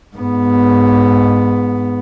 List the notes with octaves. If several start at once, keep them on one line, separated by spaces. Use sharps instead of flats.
G#2 B3